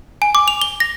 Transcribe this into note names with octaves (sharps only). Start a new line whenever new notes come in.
G#5
D6
F7
G7
A#6